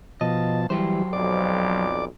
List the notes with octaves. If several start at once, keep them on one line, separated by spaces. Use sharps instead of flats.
B2 F3 D#5 A5
E3 F#3 G3 G4 C5
B1 F2 D5 D6